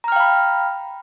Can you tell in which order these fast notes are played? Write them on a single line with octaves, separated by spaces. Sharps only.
A#5 F6 G5 F5 B5